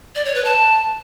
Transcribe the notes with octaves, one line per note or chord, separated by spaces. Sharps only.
D5
C#5
B4
A5